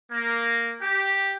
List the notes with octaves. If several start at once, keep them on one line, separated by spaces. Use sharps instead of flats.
A#3
G4